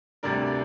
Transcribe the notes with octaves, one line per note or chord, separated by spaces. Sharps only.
D2 C3 G3 D4 A#4 D5